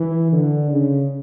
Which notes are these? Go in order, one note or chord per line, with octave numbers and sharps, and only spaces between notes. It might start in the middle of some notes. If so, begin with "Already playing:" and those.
Already playing: E3
D3
C#3